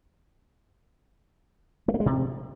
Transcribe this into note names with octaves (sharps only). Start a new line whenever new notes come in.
A3
A#3
G#3
C3